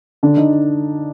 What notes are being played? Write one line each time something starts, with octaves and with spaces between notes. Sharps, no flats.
D3 D4
D3 D#4